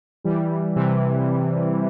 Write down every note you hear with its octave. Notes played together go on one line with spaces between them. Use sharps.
E3 G3
C3 E3